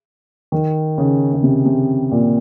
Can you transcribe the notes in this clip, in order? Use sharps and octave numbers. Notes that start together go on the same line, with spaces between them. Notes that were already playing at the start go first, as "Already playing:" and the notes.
D#3
C#3
C#3
C3
C3
A#2